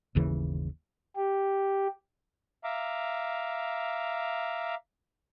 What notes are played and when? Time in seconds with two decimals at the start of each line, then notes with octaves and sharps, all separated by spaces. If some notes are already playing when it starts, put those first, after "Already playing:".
0.15 G1 D#2 C#3 E3
1.16 G4
2.64 E5 F5 A#5 D6